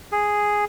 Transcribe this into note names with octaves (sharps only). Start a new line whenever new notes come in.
G#4